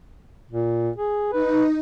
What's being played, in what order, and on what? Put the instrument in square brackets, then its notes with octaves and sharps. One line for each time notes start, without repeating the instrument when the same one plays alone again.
[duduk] A#2
G#4
[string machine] D#4 [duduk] B4